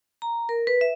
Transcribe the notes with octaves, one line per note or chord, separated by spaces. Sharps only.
A#5
A#4
B4
E5